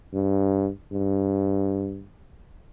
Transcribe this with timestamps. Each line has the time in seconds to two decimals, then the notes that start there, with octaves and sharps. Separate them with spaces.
0.14 G2
0.93 G2